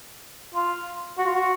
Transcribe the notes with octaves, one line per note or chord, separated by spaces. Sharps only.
F4
F#4
F4
F#4